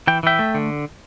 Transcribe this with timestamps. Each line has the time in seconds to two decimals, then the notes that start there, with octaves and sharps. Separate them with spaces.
0.07 E3 G5
0.23 E3 E5 G5
0.39 A3
0.54 D3